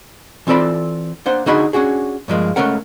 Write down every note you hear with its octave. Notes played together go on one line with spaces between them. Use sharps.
E3 C4 F4 A4 D5 B5
A#3 D4 C5 F#5
D3 D4 D#4 F#4 G#4 B5
C#4 D4 F#4 G#4
G2 F3 G#3 A#3
C#2 G#2 A3 C#4 A#4 F#5